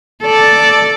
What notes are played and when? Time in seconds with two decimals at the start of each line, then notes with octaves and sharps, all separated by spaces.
0.23 A4 D5